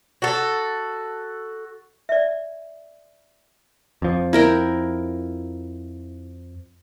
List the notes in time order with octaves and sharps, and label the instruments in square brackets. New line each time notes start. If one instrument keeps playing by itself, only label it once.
[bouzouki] F#4 A4
[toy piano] D5 E5
[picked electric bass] F2 F3
[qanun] E4 A#4 G5